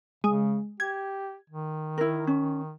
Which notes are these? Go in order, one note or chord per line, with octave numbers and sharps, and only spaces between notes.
C#3 G#3
G4 G#6
D#3
E4 A#4
C#4